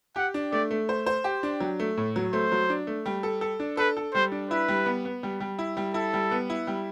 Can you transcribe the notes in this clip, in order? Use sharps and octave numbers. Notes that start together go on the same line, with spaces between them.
G4 F#5
D4
A3 D5
A3
C5
C5
G4
D4
F#3
A3
A2
F#3
A3 C5
F#3
D4
A3
G3
A4
A4
D4
A4 B4
A4
G3 C5
D4
E4 B4
G3
B3
B3
G3
G3
E4
G3
E4 A4
G3
B3
E4
G3